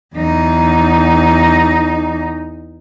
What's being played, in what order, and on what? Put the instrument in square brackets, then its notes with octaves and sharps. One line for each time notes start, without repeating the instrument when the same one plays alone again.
[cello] E2 D#4